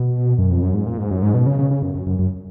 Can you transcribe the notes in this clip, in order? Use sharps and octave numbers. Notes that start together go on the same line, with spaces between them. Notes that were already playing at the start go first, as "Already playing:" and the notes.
Already playing: B2
F#2
F2
F#2
G#2
A#2
G#2
F#2
G#2
B2
C#3
C#3
C#3
F#2
F#2
F#2
F#2